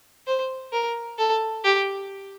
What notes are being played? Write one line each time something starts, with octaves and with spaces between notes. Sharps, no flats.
C5
A#4
A4
G4